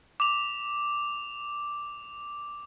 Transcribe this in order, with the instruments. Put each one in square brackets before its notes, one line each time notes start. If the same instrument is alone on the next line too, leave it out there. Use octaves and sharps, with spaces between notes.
[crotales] D6 F7